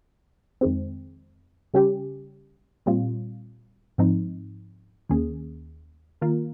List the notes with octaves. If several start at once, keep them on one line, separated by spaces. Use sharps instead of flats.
F2 D#3 G#3 C4
C#3 G3 C#4 G4
A#2 G3 C4 F4
G#2 F3 C4 D#4
D#2 D#3 A#3 C#4 G#4
D#3 A#3 F4 A#4